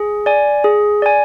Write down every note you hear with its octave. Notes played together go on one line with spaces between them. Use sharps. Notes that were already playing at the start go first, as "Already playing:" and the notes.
Already playing: G#4
D5 G#5
G#4
D5 G#5